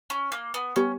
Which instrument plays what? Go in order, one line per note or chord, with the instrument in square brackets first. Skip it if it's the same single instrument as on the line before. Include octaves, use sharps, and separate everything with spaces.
[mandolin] C#4
A#3
B3
[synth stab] G3 B3 G4 [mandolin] C#4